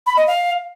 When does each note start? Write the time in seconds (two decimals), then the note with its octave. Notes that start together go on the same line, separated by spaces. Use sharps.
0.06 B5
0.17 D#5
0.27 F5